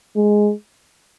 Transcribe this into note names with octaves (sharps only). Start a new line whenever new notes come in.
G#3